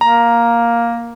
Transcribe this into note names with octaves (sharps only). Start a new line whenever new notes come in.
A#3 A#5